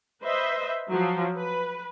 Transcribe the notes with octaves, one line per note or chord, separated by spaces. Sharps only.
B4 C5 D#5 E5
F3 F#3
B4